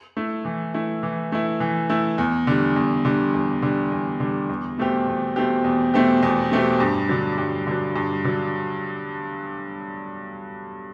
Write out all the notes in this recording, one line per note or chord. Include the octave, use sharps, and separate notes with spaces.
A3 E4
E3
A3 E4
E3
A3 E4
E3
A3 E4
E2
D3 G3
E2
D3 G3
E2
D3 G3
E2
D3 G3
E2
B2 A3 C4 G4
E2
B2 A3 C4 G4
E2
B2 A3 C4 G4
E2
B2 A3 C4 G4
G2
D3 F#3
G2
D3 F#3
G2
D3 F#3